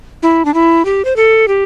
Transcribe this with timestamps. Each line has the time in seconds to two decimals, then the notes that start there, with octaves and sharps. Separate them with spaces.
0.23 E4
0.45 D4
0.54 E4
0.85 G4
1.05 C5
1.16 A4
1.48 G4